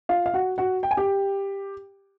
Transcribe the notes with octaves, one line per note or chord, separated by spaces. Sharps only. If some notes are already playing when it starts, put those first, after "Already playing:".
F4 F5
F5
F#4 F#5
F#4 F#5
G5
G#5
G4 G5